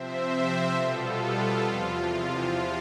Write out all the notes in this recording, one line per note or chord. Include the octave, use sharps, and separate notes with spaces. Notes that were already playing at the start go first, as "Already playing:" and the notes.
Already playing: C3 F3 C4 C5 E5
B2 G3 B3 F4 A4
E2 C3 F3 F4